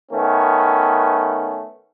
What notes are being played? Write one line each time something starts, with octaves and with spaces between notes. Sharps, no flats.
D#3 A3 B3 C#4